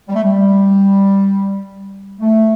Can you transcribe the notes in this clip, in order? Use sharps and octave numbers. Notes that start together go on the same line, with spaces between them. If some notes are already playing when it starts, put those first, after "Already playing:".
G3
A3
G3
A3